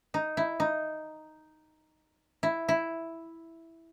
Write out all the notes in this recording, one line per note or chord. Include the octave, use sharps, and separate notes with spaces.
D#4
E4
D#4
E4
E4